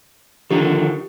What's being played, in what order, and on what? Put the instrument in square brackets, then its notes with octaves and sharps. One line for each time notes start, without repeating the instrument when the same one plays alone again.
[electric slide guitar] D3 D#3 F3 [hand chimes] G4